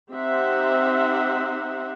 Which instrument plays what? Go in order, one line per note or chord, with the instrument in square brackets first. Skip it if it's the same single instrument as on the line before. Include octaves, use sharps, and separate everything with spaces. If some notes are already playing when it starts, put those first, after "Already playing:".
[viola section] C4 D#4 G4 C5 E5 F#5